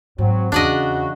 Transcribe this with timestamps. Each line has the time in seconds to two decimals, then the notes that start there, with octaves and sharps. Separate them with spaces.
0.18 G#2 F#3 C4
0.52 E2 C#3 D4 F#4 D5 D#5